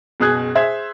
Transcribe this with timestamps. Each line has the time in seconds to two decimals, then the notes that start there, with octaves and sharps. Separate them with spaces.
0.20 F#1 B2 G#4 D#6 F#6 G#6
0.55 G#4 C5 E5 E6 G#6